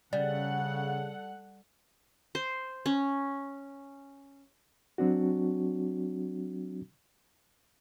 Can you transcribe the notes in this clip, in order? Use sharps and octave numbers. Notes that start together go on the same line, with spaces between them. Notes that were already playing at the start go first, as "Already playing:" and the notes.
C#3 G3 A4 D5 F#5
C5
C#4
F#3 C4 D4 F#4